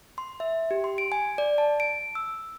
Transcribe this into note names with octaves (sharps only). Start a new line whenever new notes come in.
C6
E5
G4
C6
D7
G#5
D5
A5
D7
E6